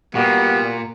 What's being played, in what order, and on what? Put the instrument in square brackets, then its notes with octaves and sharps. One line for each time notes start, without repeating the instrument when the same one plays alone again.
[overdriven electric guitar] A#2 [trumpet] G3 [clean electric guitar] A#3 F#4 [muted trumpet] B3